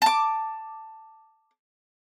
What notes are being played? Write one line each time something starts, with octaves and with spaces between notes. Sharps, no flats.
A5 D6